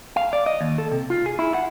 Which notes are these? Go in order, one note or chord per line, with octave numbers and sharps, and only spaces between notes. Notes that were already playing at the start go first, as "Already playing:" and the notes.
F5
D5
D#5
D#2
A4
C3
F4
G#4
E4
F#5